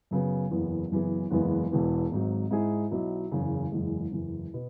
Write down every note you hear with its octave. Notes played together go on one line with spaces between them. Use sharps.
F#2 C#3 F#3 B3
F#1 E2 E3 B3
F#1 F#2 E3 B3 G#4
F#1 E2 E3 G#3 B3
E1 E2 E3 B3
G#1 G#2 F#3
G#2 G#3 E4 G#4
B1 B2 F#3 E4
F#1 E2 C#3
F#1 E2 E3 G#3
F#1 E2 E3
B2 B3